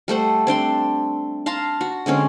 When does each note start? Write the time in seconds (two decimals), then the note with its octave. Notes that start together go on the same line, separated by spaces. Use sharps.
0.08 G3 A3 C5 F#5
0.47 C4 D4 G5 C6
1.46 F5 A5 A#5 C6
1.81 F#4
2.06 D3 G#3 C4 C#4